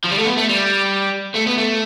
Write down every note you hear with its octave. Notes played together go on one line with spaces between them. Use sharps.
F3
G3
A3
B3
A3
G3
A3
B3
A3